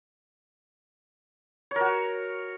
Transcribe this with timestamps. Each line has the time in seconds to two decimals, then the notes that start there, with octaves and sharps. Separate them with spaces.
1.71 C#5
1.76 A#4
1.81 F#4